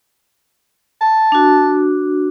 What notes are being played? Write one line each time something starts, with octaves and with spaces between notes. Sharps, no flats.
A5
D4 F#4